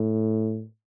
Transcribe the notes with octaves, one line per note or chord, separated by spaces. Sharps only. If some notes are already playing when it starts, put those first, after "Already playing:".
Already playing: A2